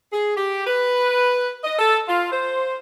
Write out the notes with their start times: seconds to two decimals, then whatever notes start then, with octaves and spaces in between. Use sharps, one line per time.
0.13 G#4
0.37 G4
0.67 B4
1.64 D#5
1.79 A4
2.09 F4
2.32 C5